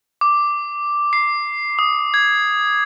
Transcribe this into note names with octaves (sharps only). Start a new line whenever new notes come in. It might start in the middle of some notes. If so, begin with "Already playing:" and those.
D6
C7
D#6
G#6